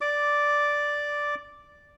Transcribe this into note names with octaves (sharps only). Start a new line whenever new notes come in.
D5 D6